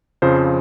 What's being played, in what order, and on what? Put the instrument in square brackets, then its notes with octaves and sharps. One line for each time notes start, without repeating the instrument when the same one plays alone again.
[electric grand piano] F2 C#3 F3 C5